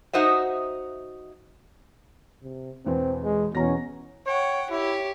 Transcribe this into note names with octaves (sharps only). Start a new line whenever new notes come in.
D#4 F#4 C5 D#5 E5
C3
E1 E2 E3 C4
G#3
E2 B2 C#4 F#4 A#5 A#6
C#5 F#5 G5
E4 G4 C#5